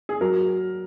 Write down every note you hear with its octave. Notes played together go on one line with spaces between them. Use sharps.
G#4
F#3 A#4